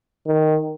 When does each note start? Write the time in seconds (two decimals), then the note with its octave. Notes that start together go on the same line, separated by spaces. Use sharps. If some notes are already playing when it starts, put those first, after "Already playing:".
0.27 D#3